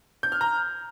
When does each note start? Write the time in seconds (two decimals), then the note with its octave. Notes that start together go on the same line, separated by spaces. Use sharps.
0.23 G6
0.32 F6
0.41 A#5